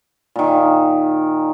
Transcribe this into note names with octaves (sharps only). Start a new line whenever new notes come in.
A#2 D#3